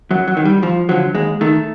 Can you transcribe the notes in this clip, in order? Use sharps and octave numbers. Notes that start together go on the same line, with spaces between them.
F#2 F#3
F#3
D#3
G3
F2 F3
D3 F3 F#3
D#2 G#3
D#3 A3